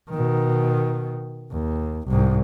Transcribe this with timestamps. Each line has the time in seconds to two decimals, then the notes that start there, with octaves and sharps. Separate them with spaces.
0.10 B2 D#3
1.52 D#2
2.08 C2 G#2